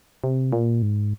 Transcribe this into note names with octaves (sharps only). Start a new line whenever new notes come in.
C3
A#2
G#2